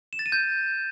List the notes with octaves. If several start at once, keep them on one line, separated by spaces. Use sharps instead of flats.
E7
A6
D#7
G6